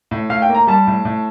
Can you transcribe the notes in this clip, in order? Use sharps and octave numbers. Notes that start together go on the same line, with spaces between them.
A2
A2 F5
G5
A#3
A#5
G3 A5
A2
A2